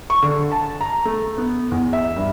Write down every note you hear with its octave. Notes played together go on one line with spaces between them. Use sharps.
C#6
D3
A5
A#5
A3
B3
E2
E5
G2